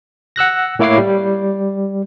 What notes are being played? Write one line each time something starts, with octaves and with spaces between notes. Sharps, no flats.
F#5 E6 F#6 A#6
A2 A#3 E4 C#5 D6 C7
G3